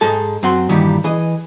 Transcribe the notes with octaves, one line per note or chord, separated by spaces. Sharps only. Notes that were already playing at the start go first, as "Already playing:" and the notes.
G#2 G#3 G#4 A4 A5
F#2 C4 F#5 C6
G2 A#2 D#3 E3 G3
E3 G#4 D#5